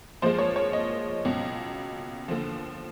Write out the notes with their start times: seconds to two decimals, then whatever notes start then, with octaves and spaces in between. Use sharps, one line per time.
0.22 A#2 F3 G#3 C5
0.39 C#5
0.56 C#5
0.73 D#5
1.25 C#2 B2 F#3
2.28 D#2 D3 F3